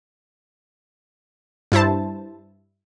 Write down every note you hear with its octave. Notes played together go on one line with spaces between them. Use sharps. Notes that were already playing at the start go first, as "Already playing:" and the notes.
G2 E4 C5 A5